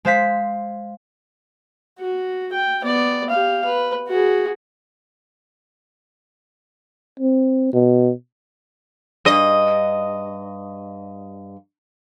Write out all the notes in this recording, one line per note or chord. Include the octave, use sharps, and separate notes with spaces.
G#3 C5 F5 B6
F#4
G5
B3 D5
G4 F5
B4
F#4 G#4
C4
B2
G2 D#5